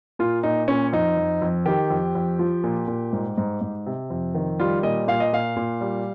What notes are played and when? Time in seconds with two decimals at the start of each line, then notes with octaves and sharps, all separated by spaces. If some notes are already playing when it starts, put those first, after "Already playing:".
0.19 A#2 F4
0.43 A#2 D#4
0.68 A#2 C#4
0.93 F2 D#4
1.17 F2
1.42 F2
1.65 D#3 G4
1.90 F2
2.15 F2
2.39 F3
2.64 A#2
2.88 A#2
3.13 G#2
3.38 G#2
3.61 G#2
3.86 C3
4.10 F2
4.34 D#3
4.59 G3 F4
4.83 A#2 D#5
5.08 A#2 F5
5.20 D#5
5.33 A#2 F5
5.57 A#2
5.81 G3